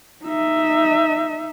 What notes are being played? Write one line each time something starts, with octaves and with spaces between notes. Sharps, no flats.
D#4 E5